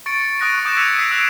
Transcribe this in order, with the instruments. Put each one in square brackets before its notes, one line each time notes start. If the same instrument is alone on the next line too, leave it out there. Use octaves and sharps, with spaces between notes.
[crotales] C#6 A6 C#7 D7
C#6 D#6 F#6 A#6 D7
D6 D#6 G6 C#7 D7 E7
E6 G#6 B6 C#7 D#7 F7
D#6 B6 C7 D7 D#7
E6 F#6 B6 D7 E7 F7